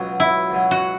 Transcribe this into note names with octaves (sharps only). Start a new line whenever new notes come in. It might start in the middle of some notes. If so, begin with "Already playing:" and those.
Already playing: C#2 B2 F#3
E4
C#2 B2 F#3
F#4